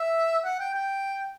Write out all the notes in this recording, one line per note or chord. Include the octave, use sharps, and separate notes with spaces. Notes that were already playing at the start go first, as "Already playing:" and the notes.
Already playing: E5
F#5
G5
G5